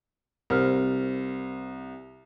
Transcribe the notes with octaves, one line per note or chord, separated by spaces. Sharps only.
C2 A#4 C5 F6